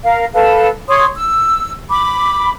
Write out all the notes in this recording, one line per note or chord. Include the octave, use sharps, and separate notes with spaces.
A#4 F5
A4 B4 F5
C#5 C6 D#6
E6
B5 D6